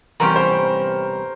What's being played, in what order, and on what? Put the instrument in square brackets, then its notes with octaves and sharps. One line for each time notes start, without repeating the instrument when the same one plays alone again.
[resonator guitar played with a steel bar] E2 C3 G3 C#4 G4 [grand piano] A#4
[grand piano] C5